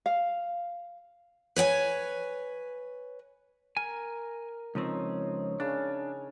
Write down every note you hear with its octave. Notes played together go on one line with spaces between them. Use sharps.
F5
B4 C#5 G5 G#5
A#4 G#5
C#2 F3 C4 D#4 C#5
C#3 C#4 D4